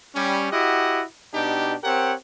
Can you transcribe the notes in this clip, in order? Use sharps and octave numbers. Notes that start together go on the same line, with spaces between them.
G3 C#4
E4 F#4 G4 D#5 F#5
B2 D4 D#4 G4
C4 G4 A#4 C#5 F#5